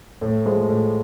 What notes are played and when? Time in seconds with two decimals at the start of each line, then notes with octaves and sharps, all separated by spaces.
0.21 A2
0.46 F3 G#3
0.69 A2